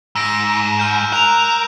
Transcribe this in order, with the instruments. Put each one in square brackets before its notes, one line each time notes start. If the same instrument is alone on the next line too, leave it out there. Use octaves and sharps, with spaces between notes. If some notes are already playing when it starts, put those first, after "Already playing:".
[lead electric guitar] G#2 [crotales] E6 A#6 D7
[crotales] F6 G6 E7
[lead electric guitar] A#4 [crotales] F#6 E7 F7